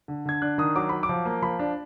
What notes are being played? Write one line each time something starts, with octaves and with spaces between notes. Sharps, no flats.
D3
D3 G#6
D4 F#6
D#3 D#6
F#3 D6
F#3 B5
D6
F3
A#3
F3 B5
D4